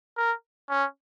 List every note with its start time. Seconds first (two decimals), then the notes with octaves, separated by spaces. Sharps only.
0.17 A#4
0.69 C#4